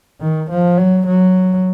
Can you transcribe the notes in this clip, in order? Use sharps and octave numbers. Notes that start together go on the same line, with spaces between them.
D#3
F3
F#3
F#3